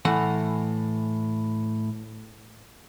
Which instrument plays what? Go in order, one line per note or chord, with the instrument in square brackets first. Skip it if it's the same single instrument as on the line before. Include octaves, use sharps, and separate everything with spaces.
[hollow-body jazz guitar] A2 E3 F#5